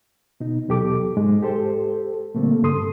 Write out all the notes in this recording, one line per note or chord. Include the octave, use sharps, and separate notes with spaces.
B2 D#4
E2 B2 F#3 G4 A4 D6
G#2 G#3
G4 A4 C5
A#2 D3 G3 A3 A#3 C4
G2 C#3 A4 C6 D#6